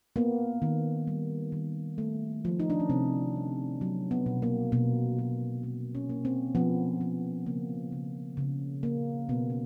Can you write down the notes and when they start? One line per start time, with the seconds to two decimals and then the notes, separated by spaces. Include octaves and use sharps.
0.16 A#3 B3
0.62 D#3
1.07 G3
1.52 D#3
1.98 A3
2.45 F3
2.60 D#4
2.70 D4
2.80 C#4
2.89 C3 C4
3.36 F3
3.81 F#3 B3
4.11 B3
4.26 B2
4.42 A#3
4.72 B2 A#3
5.19 B2
5.63 A#3 C4
5.95 C#4
6.09 A#3
6.25 C4
6.55 F3 B3
7.01 F3
7.46 C#3 A#3
7.92 C#3
8.37 C#3
8.83 A#3
9.29 B2 B3
9.50 C#4